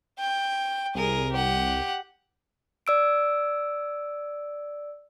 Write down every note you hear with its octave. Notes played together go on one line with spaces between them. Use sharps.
G5
C2 G#4 A#4
G4 F#5
D5 E6 D7